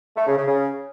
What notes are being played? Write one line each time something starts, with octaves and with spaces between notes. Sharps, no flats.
A3
C#3
C#3
C#3